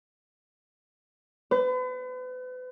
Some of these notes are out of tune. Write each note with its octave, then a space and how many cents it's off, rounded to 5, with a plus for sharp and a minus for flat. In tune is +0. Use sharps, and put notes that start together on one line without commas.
B4 +40